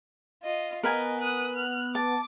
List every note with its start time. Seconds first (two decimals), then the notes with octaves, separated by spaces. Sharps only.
0.43 F4 D#5
0.83 B3 A#4 B4 D#5 G#5
1.21 D#6 F#6
1.56 F6 F#6
1.95 A5 D6